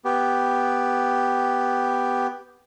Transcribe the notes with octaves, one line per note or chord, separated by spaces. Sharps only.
B3 G4